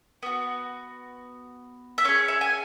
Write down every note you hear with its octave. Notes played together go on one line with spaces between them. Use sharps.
B3 F#4
E5
C#4 G#4 C#5
E5
G#5